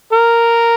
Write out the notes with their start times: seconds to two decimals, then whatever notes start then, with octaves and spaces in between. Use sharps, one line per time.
0.13 A#4